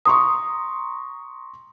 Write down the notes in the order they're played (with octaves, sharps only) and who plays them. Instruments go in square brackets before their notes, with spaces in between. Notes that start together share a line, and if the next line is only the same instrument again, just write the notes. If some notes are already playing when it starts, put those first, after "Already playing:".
[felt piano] A#5 C6 C#6 [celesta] D#6